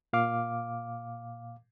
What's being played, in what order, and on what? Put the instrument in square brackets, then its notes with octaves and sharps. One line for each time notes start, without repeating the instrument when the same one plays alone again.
[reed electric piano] A#2 F5 D6